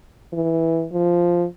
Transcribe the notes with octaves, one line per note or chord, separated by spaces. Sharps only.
E3
F3